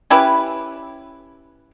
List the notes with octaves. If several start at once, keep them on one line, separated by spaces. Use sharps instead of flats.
C#4 E4 G4 B4